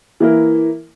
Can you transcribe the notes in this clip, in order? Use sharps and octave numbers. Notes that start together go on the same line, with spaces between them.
E3 A#3 E4 A#4